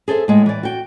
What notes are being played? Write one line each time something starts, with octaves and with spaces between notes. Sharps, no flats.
G#4 A4 C5 E5
A2 G#3
E3 D5
F#4 G5